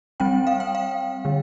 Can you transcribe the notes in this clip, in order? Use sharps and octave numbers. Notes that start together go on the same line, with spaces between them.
G3 C4 G5
F5
G5
F5
D3 G3